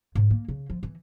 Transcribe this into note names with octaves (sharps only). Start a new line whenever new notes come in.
G#2
A#3
C#3
F3
E3